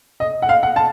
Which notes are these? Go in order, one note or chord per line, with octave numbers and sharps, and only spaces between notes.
D#5
F#5
F5
F#5
A5